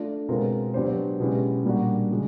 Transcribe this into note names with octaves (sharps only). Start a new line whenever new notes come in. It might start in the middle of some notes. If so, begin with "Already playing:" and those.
Already playing: A3 D4 F4
B2 G#3 C4 F4 A#4
F#3 B3 D4 G4 C5
B2 G#3 C#4 E4 G4
A#2 G3 A#3 D4 F#4
C#3 F3 G#3